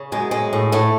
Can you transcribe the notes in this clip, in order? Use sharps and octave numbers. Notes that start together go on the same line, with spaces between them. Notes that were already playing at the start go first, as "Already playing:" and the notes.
Already playing: C#3
F#2 G#3
A2 G#3
A2
A2 A3